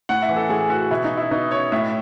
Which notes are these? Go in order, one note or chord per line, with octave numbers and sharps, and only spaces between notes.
A2 F#5
E5
E3
A4
A2 G#4
E3 F#4
B2 E4
D#4
E4
B2 D#4
C#5
A2 E5